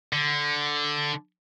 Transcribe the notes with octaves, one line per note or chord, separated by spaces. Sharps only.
D3